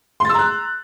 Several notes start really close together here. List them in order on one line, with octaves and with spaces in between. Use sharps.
C6 A6 E6 A#5 F#6